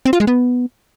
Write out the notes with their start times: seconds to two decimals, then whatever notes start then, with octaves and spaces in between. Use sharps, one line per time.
0.06 C4
0.13 F4
0.20 G#3
0.27 B3